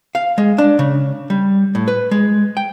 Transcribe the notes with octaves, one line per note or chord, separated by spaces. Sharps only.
F5
G#3
D4
C#3
G3
A2
B4
G#3
G5